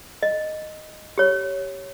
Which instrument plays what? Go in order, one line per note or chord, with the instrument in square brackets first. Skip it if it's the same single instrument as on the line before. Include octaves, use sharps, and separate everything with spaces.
[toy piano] D#5
G4 C#5